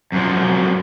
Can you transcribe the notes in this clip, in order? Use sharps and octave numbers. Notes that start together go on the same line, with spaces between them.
F#2 F3